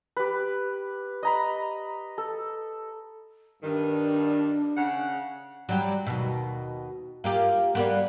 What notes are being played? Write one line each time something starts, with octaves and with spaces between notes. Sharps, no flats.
G4 B4
D#5 A#5 B5
A4
G2 D#3 D4
C#3 F#5
F#3 G3 G4
D#2 B2
A#3 F4 G4
G3 A#3 B3